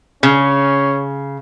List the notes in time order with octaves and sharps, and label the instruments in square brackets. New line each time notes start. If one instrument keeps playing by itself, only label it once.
[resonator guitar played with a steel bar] C#3 [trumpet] C#4